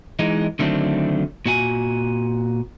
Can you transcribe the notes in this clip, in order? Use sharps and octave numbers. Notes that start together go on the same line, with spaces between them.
E3 G#3 D#4
D3 D#3 F#3 A3 C4 D4
A#2 F#4 G#5